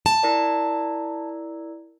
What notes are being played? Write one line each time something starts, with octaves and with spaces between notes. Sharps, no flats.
A5
E4 A#4 D5